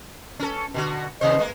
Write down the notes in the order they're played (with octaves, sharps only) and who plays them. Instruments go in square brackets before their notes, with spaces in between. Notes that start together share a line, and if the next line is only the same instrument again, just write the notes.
[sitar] C#4 A4
B2 D3 F#4
[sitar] D#2 C3 C5 [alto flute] D#5
[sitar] G#3 A#3